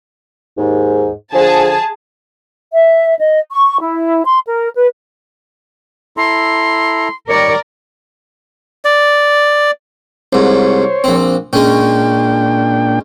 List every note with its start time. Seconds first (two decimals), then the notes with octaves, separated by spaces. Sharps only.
0.57 D#2 G#2
1.33 D3 F3 G#4 A5
2.72 E5
3.18 D#5
3.50 C#6
3.79 E4
4.24 C6
4.45 A#4
4.75 B4
6.17 E4 A4 A#5 C6
7.29 D#3 G3 A#4 C#5 D5 C#7
8.85 D5
10.33 C2 G#2 C5 C#5
11.04 A#1 C4
11.53 A#2 G#3 C#4 D4 G5